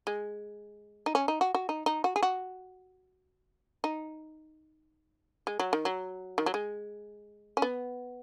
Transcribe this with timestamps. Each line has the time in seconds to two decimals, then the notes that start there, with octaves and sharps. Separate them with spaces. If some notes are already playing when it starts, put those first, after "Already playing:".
0.07 G#3
1.06 D#4
1.15 C#4
1.28 D#4
1.41 F#4
1.54 F#4
1.69 D#4
1.86 D#4
2.04 F#4
2.16 G#4
2.22 F#4
3.84 D#4
5.47 G#3
5.59 F#3
5.73 D#3
5.85 F#3
6.38 D#3
6.46 F#3
6.54 G#3
7.57 C#4
7.62 B3